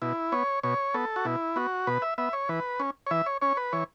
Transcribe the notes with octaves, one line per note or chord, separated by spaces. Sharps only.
B2 E4
B3 C#5
B2 C#5
B3 A4
F#4
B2 E4
B3 F#4
B2 B4
E5
B3 E5
C#5
E3 B4
C#4
C#5
E3 E5
C#5
C#4 C#5
B4
E3 C#5